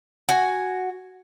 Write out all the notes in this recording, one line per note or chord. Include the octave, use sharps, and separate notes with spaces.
F#4 G#5